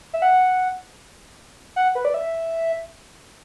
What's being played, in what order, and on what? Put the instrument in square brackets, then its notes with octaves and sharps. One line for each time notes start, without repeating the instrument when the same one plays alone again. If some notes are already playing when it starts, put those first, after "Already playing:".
[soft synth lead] E5
F#5
F#5
B4
D5
E5